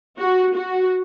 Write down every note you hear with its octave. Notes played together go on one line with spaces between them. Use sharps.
F#4
F#4